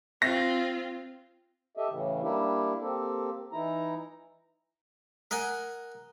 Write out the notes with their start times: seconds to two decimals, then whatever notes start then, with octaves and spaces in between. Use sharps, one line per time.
0.22 C4 F4 A#6
1.77 G4 A4 D#5 E5
1.89 A2 C#3 E3
2.22 G3 A#3 D4 E4 G4
2.80 A#3 C4 G4 A4
3.53 E3 D#4 E4 A#5
5.31 A#4 D#5 F#5 G#5